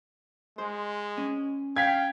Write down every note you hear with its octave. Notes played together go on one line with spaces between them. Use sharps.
G#3 C5
C#4
F5 G5 G#6 B6